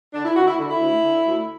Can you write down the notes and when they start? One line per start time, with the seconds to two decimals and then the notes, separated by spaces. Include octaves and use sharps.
0.14 D3 D4
0.25 E4
0.36 D2 F#4
0.47 E4
0.59 D3
0.69 E4
0.80 D2
1.03 D3
1.25 D2